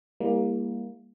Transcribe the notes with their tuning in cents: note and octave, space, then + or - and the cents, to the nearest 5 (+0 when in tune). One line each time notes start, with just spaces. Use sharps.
G3 +45 A#3 +15 E4 +0